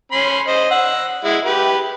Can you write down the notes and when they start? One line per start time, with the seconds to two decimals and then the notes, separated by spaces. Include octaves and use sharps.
0.12 C#4 B5 C6
0.47 C5 D#5
0.71 F#5 E6
1.24 G#3 E4
1.45 G4 B4